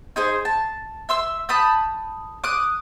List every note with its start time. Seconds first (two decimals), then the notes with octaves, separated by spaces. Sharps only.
0.16 D#4 G#4 C5
0.45 A5
1.09 E5 C6 E6
1.49 A5 B5 D#6 G6
2.44 D6 D#6 F#6